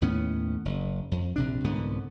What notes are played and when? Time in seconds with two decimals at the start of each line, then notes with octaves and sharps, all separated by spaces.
0.01 D#2 A2 B3 C#4
0.65 F#1
1.11 F2
1.36 A#1 C3 D4
1.64 C2 G#2 D3 B3